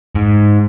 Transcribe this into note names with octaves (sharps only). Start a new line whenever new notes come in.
G#2